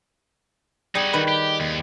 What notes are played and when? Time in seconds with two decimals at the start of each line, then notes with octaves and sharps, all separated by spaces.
0.95 G3 D#4 F#4 G#4
1.13 D#3 B4 B5
1.28 G4
1.60 D#2